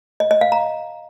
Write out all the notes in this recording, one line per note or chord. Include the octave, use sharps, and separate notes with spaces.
D#5
D#5
F5
A#5